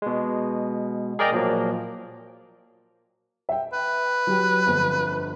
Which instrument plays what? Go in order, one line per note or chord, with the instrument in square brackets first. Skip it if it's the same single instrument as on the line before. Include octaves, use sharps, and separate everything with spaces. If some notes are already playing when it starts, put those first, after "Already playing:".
[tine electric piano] B2 G#3
G#4 A#4 D5 D#5 G5 A#5
A#2 F3 F#3 A#3
[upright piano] E5 G5
[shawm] B4
[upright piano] F#3 G4 G5
G1 F2 D3